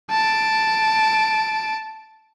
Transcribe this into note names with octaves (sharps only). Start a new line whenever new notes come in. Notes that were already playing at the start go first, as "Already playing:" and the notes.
A5 D7